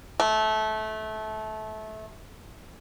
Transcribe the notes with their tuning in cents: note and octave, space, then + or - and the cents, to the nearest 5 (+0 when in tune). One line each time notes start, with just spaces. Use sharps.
A3 -20